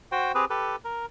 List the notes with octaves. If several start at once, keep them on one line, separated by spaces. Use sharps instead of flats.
F#4 C5 G5
C4 G4 G#4 B4
G4 A4 B4
A#4